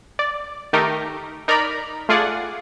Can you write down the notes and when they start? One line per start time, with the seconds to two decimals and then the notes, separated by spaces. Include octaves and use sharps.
0.19 D5
0.73 D#3 A3 D#4 G4 A#4
1.48 D#4 A#4 D5 A#5 B5
2.09 A3 F4 G#4 D5 F#5